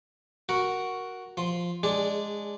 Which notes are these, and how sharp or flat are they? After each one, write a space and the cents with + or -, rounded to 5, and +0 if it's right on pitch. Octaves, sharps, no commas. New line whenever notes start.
F#4 +0 A#4 +0 F#5 +0
F3 +0 C6 +0
G#3 +0 D4 +0 G#4 -25